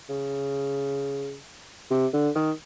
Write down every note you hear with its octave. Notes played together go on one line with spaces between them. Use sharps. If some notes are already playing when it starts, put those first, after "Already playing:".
C#3
C3
D3
D#3